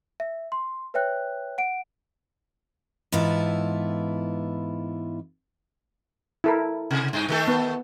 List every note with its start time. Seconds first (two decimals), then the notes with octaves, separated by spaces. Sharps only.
0.20 E5
0.52 C6
0.94 B4 C#5 E5 G5 F#6
1.58 F#5 D7
3.12 G#2 E3 B3 E4 F4 A4
6.44 E4 A4 A#4
6.91 C3
7.13 G2 D#4
7.28 D#3 A3 A4
7.48 B3